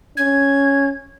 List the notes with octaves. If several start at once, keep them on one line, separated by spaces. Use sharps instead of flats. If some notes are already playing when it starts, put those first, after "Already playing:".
C#4 G#6